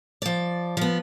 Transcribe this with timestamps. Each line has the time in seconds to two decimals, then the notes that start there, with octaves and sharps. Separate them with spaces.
0.22 F3 D5
0.77 F3 B3